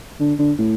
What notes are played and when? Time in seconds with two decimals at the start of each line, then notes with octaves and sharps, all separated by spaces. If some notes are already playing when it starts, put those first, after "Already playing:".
0.20 D3
0.39 D3
0.59 A2